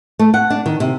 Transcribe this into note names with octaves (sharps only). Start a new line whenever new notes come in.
A3
F#5
D4
D#3
C3